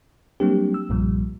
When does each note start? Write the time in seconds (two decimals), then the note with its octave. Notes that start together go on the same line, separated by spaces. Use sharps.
0.40 F#3 G3 A#3 C4 D4 G4
0.74 E6
0.89 B1 G2 A#2 F3 G3